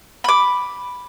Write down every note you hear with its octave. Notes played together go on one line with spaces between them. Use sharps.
B5 D6